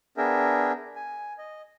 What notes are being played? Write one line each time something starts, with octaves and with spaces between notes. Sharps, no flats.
B3 D4 G#4 A#4 E5 G5
G#5
D#5